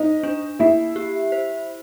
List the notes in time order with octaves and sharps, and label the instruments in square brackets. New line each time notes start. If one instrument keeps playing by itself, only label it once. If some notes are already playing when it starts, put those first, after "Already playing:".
Already playing: [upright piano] D#4 D#5 [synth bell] C5
[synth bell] D4
[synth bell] A#3 [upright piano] E4 E5
[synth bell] G4
C5